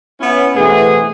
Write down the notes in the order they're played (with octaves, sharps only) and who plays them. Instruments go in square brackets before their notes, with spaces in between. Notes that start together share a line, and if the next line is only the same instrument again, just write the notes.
[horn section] B3 C#4 E4
B2 E3 A3 B3 C4 G#4